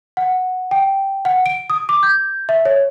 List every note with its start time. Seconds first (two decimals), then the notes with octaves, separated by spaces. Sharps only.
0.17 F#5
0.71 G5
1.25 F#5
1.46 D7
1.70 D#6
1.89 D6
2.03 G6
2.49 E5
2.65 C#5